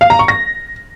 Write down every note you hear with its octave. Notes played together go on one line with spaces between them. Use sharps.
F5
A#5
C#6
A#6